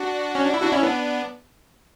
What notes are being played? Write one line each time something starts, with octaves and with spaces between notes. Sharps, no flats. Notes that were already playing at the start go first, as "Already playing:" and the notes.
Already playing: D4 F#4
C#4
D4
E4
D4 F#4
C#4 E4
B3 D4